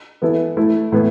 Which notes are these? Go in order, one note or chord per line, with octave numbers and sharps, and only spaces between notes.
E3 B3 E4 A4
A3 E4 A4
A2 E3 B3